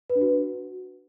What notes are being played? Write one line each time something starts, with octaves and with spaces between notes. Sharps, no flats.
B4
D4
F#4